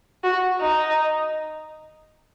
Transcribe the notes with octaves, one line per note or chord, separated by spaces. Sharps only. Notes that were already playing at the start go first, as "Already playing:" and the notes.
F#4
D#4